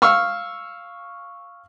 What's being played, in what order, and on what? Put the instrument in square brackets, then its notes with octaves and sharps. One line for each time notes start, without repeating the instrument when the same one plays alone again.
[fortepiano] F5 C#6 E6 F6